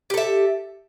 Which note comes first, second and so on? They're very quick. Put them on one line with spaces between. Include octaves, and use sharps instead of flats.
G4 A4 E5